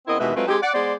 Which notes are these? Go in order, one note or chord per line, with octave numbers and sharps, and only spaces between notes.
C#3 B3 C4 E4 A#4 D#5
D#2 B2 E3 G#3 B4 E5
F#3 G#3 A3 C4 F4 B4
G#3 C4 D#4 G4
D5 F#5
G#3 B3 C5 D5